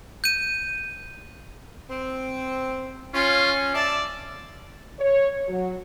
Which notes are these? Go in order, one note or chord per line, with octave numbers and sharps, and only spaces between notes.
G6 D#7
C4
C#4 F4
D5 E5 A5
C#5
F#3